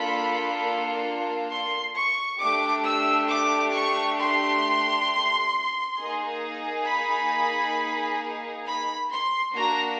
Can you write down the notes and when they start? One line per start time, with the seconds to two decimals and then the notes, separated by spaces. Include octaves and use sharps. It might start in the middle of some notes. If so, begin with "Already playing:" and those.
Already playing: A#3 D4 F4 A4 B5
1.51 C6
1.96 C#6
2.40 A3 D4 G4 D6
2.86 E6
3.30 D6
3.75 C#6
4.20 C6
5.98 A#3 D#4 G#4
6.87 B5
8.66 B5
9.10 C6
9.55 A#3 D4 F#4 A#5